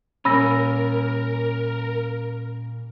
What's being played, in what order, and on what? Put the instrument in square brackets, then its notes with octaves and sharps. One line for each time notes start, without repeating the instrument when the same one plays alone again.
[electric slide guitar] A#2 G3 [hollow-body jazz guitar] C#4 [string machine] A#4 [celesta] B5 E6 A#6